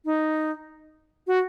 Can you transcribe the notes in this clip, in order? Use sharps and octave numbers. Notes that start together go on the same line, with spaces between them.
D#4
F#4